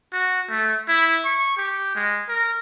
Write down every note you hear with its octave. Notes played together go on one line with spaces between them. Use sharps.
F#4
A3
E4
C#6
G4
G#3
A#4